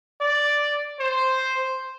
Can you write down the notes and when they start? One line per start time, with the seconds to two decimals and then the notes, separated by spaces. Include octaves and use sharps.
0.21 D5
1.00 C5